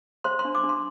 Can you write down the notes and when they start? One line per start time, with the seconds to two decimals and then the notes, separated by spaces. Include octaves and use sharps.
0.24 C5 C6
0.39 C6
0.45 D4
0.55 D6
0.63 D4
0.69 C6